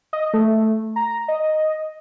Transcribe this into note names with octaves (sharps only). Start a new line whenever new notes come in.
D#5
A3
A#5
D#5